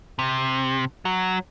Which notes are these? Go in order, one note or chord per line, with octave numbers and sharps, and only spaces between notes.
C3
F#3